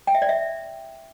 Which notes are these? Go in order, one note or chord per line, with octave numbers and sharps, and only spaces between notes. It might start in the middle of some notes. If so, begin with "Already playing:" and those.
G5
E5
D5
E5